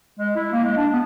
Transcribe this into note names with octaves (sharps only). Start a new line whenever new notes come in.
G#3
E4
A#3
G#3
D4
B3